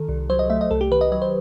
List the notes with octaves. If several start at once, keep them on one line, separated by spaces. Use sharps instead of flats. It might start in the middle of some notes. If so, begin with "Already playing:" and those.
Already playing: D#3 A4
C2
F#3 C5
D#5
A3 E5
D#5
C2 A4
G4
D#3 B4
D#5
F#3 D#5
C5